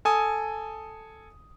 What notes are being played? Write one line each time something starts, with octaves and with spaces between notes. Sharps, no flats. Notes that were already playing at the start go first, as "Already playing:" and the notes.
A4 G#5 D#6